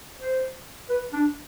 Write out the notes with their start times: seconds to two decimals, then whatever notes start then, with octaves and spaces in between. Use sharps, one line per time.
0.19 C5
0.90 B4
1.13 D4